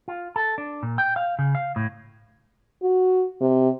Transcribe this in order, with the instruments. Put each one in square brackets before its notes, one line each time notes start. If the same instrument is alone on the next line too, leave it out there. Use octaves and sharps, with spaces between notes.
[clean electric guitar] F4
A4
D4
A#2
G5
F5
C#3
F5
A2
[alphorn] F#4
C3